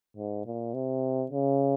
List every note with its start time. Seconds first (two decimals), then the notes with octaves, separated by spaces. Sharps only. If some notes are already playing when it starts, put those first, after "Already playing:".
0.17 G#2
0.46 A#2
0.74 C3
1.31 C#3